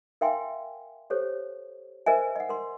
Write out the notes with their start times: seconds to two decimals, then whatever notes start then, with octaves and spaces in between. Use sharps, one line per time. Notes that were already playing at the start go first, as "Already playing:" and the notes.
0.21 A#4 E5 F5 G5 G#5 C6
1.10 G4 A4 C5 C#5
2.06 A#4 C5 D#5 E5 G#5
2.36 D#5 F#5
2.49 A#4 C6